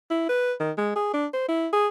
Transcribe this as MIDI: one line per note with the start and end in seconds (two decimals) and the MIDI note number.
0.10 0.26 64
0.29 0.53 71
0.60 0.71 51
0.77 0.91 56
0.96 1.13 68
1.14 1.26 62
1.33 1.44 72
1.48 1.68 64
1.73 1.87 68